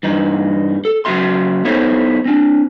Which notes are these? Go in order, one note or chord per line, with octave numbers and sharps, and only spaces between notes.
G2 E3 D#4
A4
C#3 F#3 C4 F#4 E5 C6
B3 D#4 E4 A4 C5 C#5
C4 D4